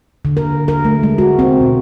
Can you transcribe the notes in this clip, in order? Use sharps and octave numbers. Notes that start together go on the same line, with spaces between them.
D3
A#4
A#4
A3
G#3
F#4
C4
B2